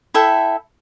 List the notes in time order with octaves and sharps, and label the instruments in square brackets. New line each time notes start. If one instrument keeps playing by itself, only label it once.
[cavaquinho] E4 A4 E5 G5